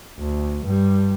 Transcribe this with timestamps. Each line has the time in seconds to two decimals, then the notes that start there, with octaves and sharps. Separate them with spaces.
0.19 D2
0.65 G2 G3